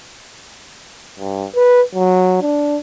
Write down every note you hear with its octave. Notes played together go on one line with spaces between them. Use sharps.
G2
B4
F#3
D4